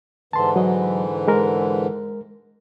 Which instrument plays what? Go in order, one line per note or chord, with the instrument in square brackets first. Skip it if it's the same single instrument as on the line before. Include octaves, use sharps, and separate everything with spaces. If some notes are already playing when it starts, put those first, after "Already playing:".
[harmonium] G#2 D3 E3 [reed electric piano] A5 C6
[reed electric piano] F#3 D#5
G#3 A#4